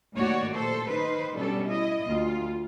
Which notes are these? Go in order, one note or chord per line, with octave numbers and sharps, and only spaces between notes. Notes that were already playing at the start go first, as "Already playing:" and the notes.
D#2 A2 F#4 C#5 D5
A#2 A4 C5
D#3 D#4 B4 C5
B2 G3 C#4 D4 A4
E4 D#5
D2 F4